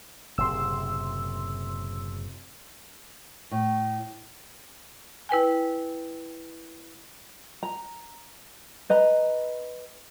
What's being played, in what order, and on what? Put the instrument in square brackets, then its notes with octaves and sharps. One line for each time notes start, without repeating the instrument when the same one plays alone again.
[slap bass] F#1 A2 C3 [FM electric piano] C6 E6
[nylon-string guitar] A2
[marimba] E4 B4 G5 G#5
[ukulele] A#5
B4 D#5 A#5